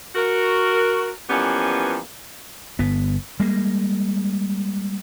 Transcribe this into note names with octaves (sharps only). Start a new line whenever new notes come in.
F#4 A#4
E3 F3 G3 A#3 B3 C#4
G1 B3
G3 G#3 A#3